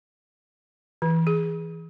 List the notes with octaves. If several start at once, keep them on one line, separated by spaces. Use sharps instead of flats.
E3
G#4